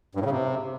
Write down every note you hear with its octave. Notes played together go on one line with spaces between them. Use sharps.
G2
A2
C#3
C3